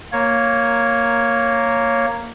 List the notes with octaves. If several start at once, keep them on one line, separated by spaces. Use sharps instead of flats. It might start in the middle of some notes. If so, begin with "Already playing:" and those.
A#3 C#5